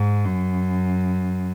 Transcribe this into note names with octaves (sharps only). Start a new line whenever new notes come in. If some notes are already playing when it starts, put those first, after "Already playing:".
Already playing: G#2
F#2